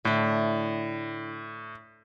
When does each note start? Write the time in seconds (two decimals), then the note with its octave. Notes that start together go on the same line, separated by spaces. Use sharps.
0.05 A2 D3 A3 E4